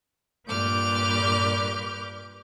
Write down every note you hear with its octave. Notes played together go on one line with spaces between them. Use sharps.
G2 A#2 B4 D6 F6 G6